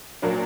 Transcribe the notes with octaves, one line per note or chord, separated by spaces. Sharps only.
A#2 F#3 A#3 D4